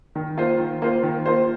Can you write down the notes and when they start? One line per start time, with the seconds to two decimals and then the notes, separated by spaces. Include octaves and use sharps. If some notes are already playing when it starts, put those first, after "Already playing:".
0.15 D#3
0.37 A#3 F4 C5
0.59 D#3
0.82 A#3 F4 C5
1.03 D#3
1.26 A#3 F4 C5